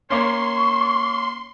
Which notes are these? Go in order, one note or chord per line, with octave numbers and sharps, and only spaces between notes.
A#3 C#4 C6 C#6